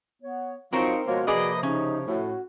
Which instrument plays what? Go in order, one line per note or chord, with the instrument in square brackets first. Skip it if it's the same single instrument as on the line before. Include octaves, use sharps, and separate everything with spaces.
[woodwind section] B3 C#5
[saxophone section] F3 F#3 [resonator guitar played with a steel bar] C4 A#4 C5 [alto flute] D#4 [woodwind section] F5 C#6
[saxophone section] B2 F3 A#3 [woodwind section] G#3 C#5 [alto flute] F#4
[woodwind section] C3 F3 [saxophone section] A#3 B4 D#5 [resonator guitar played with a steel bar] G#4 D5
[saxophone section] C#3 [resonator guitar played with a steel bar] C#4 [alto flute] D#4
[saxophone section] A2 [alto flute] F#4